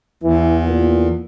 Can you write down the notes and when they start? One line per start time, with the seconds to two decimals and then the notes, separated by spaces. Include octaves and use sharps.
0.23 E2 E3
0.67 A#2